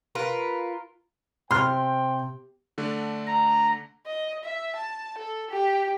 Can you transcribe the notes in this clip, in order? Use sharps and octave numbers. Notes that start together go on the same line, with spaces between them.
F4 A#4 B4
C3 C5 G5 C6 F6
D3 A3 D4
A#5
D#5
E5
A5
A4
G4